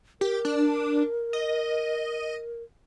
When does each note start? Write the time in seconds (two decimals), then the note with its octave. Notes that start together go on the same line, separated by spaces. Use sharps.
0.21 G4 A#4
0.45 D4
1.33 D#5